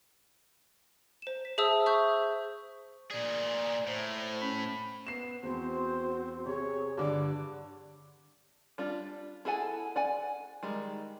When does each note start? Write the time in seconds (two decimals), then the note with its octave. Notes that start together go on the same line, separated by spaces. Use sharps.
1.22 C5 E7
1.45 B6
1.58 G#4 C5 E5 A5 D#6 E6
1.86 E5 C#6 G6
3.11 A#2 G#4 D5
3.87 A2 C5
4.41 C#4 B5
5.07 B3 C7 E7
5.43 E2 C4 F#4 C5
6.46 C3 G#4 C#5
6.98 G2 D3 D5 D6
8.78 G3 D4 F4
9.45 E4 G#4 A4 F#5 G#5
9.96 D5 F#5 G#5
10.63 D#3 G3 G#3